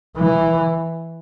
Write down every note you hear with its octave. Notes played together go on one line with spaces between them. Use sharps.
E3